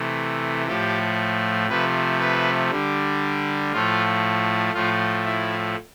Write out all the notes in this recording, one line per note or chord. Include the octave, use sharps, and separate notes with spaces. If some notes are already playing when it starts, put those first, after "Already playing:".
Already playing: C3 E3 A3
A2 F3 A3 G4
C3 F3 A3 B4
B4
D3 G3
A2 F3 A3 F4
A2 F3 A3 F4
E4